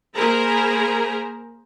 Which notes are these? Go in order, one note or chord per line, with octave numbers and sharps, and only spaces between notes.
A#3 G#4 A#4 C5 A#5 B5